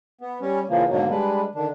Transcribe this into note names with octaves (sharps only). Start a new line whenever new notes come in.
B3
G3 C#4
C#3 E3 F3 A#3
G#2 B2 D3 D#3 F#3 A#3
G3 G#3 D4 B4
D3 D#3 D4